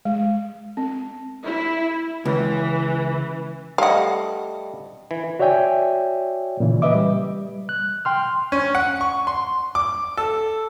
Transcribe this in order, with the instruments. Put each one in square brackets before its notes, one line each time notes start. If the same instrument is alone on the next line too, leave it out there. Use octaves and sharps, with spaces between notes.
[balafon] G#3
C4
[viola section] E4
[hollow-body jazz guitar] C#2 [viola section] E3
[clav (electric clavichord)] G3 A3 D#5 [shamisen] F5 F#5
[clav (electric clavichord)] E3
[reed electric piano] F#4 C#5 D5 E5 G5 G#5
A#2 C#3 E3
B4 D#5 E5 D6
G3
F#6
G5 C6 F6
[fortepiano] C#4
F#5
C#6
C6
D6
A4